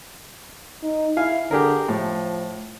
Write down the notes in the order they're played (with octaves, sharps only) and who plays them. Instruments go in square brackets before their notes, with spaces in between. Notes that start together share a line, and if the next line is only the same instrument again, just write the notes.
[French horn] D#4
[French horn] E4 [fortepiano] F5 G#5
[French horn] D3 [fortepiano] G4 G#4 A#4
[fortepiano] A2 [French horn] F3